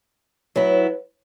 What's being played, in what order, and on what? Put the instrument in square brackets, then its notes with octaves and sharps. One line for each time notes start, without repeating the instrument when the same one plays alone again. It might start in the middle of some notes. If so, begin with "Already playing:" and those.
[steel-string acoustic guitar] F#3 B3 E4